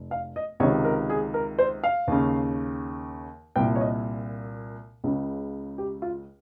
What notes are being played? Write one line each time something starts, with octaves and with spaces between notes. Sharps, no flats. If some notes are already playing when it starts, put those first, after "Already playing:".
Already playing: F1
F5
D#5
C#2 C3 D#3 C#5
A#4
G#4
A#4
C5
F5
D#2 C#3
C2 A#2 G5
C#5
D#5
C#2 C#3
G4
F4